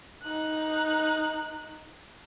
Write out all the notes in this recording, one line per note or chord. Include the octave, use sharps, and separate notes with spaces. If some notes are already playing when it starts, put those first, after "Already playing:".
D#4 F#6